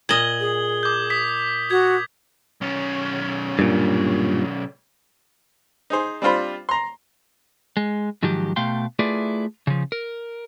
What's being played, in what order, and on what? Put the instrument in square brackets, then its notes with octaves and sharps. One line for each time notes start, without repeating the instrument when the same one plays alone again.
[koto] A#2 D#5 [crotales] G#6 F#7 G7
[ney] G#4
[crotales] D6 G6
D#6 B6
[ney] F#4 [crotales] G#6
[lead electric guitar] B1 C#4
[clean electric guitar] G2 A#2
[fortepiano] D#4 G#4 C5
G3 C4 D4 F4 C5 B5
A#5 C6
[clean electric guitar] G#3
G#2 D#3 F3 F#3 G4
B2 A3 F5 G5 C6
A3 E4 F4 G#4 B4 D5
C#3 F3
A#4